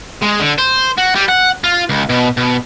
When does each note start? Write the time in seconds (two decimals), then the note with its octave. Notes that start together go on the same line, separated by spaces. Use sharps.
0.22 G#3
0.40 D3
0.58 C5
0.98 F#4
1.15 G3
1.29 F#5
1.64 F4
1.89 C#2
2.09 B2
2.37 B2